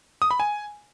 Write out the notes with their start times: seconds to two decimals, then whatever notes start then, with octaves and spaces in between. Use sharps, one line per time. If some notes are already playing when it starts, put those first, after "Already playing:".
0.22 D#6
0.31 B5
0.40 G#5